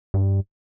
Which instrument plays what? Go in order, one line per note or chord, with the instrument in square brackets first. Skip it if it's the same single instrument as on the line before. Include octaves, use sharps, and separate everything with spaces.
[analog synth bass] G2